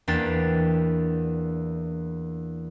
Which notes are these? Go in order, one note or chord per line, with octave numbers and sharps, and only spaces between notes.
E2 A#3 D4 G4 A6 E7